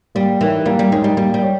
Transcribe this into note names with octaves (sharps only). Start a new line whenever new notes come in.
G3 A#3
E3 D#4 A#4 C#5
G3 A#3
G3
G#3 D#4 A#4 C#5
G3
G3 A#3
G3
C#5